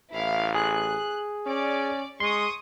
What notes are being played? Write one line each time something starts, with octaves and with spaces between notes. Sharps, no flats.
A1 E4 F5
G#4 F#6
C#4 D5
G#3 C6 C#6 D#6